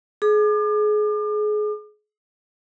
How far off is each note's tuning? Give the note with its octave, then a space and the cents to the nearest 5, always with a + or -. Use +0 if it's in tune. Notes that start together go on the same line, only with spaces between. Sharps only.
G#4 +30 D6 +40